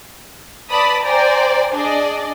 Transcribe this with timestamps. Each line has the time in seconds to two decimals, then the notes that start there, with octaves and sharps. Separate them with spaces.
0.70 B4 D5 A5 B5 D#6
1.03 C5 D5 G5 G#5 A#5
1.74 D4 G#4 D5 D#5